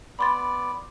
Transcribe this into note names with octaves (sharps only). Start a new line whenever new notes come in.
B3 D5 B5 C6 A6